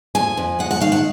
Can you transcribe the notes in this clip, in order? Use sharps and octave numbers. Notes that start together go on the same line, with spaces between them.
F2 G#5
F2
G#3 F#5
F#5
D#3 F5
F#5